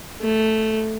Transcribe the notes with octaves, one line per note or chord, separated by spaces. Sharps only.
A3